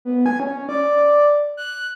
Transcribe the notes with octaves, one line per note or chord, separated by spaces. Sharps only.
B3
G#5
C#4
D5
F#6